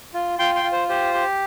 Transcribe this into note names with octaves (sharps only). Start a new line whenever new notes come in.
F4
F4 G5 C6
G5 C6
F4
C5
G4 C5
G4